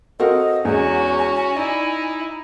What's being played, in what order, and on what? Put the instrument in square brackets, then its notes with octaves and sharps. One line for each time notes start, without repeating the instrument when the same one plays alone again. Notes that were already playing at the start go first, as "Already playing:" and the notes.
[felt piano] C4 F#4 F5 [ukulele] A4 A#4 F#5 [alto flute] D#5
[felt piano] E2 G#3 [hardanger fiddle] C#4 F#4 [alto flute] G#5
[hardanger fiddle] D#4 E4 [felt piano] D5